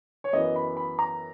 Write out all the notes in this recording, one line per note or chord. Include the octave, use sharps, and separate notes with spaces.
C#5
F#2 E3 B3 D#5
B5
B5
A#5